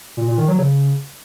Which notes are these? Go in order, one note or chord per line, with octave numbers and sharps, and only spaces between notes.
A#2
A#2
D#3
F#3
C#3